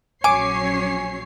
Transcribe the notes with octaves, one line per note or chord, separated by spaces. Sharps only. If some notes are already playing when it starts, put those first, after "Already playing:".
A#1 F#3 C#4 C#5 G#5 D6 C7